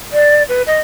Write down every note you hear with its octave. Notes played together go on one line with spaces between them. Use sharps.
D5
B4
D#5